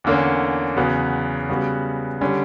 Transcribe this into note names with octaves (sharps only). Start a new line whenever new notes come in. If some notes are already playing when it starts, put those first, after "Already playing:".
E2 D3 A#3 C#4
E2 C#3 F#3 B3
C#3 G3 B3 F#4
D3 G3 C#4